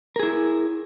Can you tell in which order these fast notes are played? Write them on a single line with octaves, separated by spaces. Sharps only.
A#4 G#4 E4